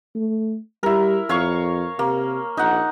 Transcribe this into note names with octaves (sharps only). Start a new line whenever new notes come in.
A3
G3 E4 A#4
F2 C#5 F5 C#6
C3 A#3
A#1 D#4 F#5